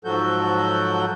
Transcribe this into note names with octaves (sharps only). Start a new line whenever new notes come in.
G#2 F3 F#3 F#4 A4 G6